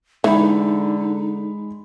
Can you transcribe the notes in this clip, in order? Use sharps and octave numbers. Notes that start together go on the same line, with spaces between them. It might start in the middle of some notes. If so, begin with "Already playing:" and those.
D3 E3 G#3 D#4 B5